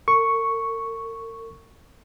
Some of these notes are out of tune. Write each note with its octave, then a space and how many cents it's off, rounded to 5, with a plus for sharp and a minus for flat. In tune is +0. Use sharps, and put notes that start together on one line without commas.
A#4 -40 C#6 +0